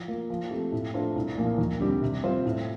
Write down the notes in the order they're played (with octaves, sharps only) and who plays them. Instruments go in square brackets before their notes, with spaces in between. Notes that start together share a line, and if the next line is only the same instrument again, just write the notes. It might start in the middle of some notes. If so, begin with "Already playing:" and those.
Already playing: [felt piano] F3
A#3 F4
F3
A3 C4 G4
A2
A3 D4 F4 C5
C2
A#2 F3 A#3
D#2
D3 G3 C4 G4
C3
G3 C4 F4 C5
A2